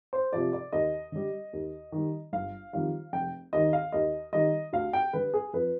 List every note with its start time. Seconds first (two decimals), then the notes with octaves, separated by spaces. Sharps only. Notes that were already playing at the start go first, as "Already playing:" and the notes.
0.13 C5
0.33 C3 F3 D5
0.53 D5
0.73 D#2 D#5
1.12 D3 G3
1.53 D#2
1.92 D#3 G3
2.33 G1 F5
2.73 F2 D#3 G3 F5
3.13 F1 G5
3.53 D#2 D#3 D#5
3.73 F5
3.92 D#2 D#5
4.33 D#3 G3 D#5
4.73 D2 F5
4.93 G5
5.13 D3 G3 B4
5.34 G#4
5.53 F2 B4